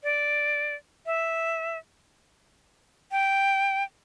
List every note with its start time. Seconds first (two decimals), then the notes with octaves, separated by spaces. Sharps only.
0.03 D5
1.06 E5
3.12 G5